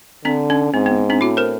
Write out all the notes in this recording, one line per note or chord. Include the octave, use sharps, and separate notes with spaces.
D3 C4 D4
C#4
G#2 C4
B3
C4 D4
A2 E4 F#4
A#4 C5